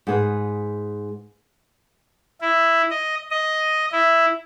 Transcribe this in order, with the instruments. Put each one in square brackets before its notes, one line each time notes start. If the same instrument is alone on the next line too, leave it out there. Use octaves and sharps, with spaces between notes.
[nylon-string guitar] G#2 G#4 B4
[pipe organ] E4
D#5
D#5
E4